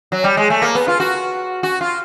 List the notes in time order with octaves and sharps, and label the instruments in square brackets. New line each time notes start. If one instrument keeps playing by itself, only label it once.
[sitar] F#3
G3
G#3
A3
A#3
B3
F4
F#4
F#4
F4